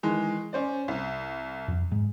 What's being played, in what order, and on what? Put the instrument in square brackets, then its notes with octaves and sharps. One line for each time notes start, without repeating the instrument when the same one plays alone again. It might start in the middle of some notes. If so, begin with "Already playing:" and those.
[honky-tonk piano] D#3 E3 G#3
C#4 C5 D5
C2
[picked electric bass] F2
G#2 G#3